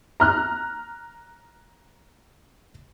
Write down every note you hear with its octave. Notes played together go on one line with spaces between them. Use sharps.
A#5 F6 F#6